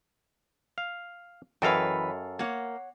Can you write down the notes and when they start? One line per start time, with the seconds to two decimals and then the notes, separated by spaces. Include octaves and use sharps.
0.78 F5
1.62 F#2 E3 A4 B4 C#5 D#5 F5 G5
2.39 A#3 C#5 F#5